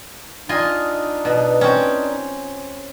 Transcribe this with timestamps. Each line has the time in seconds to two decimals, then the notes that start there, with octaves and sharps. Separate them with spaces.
0.49 D4 D#4 F4 D#5 G#5
1.25 B2
1.61 C4 C#4